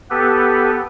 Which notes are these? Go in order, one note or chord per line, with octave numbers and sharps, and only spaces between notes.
B3 G4 A4 B4